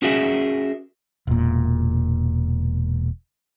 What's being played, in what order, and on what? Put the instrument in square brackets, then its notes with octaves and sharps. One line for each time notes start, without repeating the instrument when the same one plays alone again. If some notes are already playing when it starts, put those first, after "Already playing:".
[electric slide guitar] C#4 F#4 G#4 A#4 D5 E5
[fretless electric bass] E1 A#2